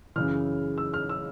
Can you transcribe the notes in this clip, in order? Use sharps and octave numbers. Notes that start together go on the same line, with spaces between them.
F#2 C#3 E3 F6
E6
F6
E6